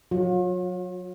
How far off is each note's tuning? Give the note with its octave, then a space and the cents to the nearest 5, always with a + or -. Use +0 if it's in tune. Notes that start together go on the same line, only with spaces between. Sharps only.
F#3 -20 F4 +45